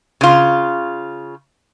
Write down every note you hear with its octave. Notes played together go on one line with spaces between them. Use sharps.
C#3 F4